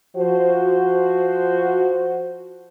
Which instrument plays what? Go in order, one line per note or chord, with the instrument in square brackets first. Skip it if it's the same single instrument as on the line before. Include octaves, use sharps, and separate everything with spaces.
[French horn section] F3 F#4 C5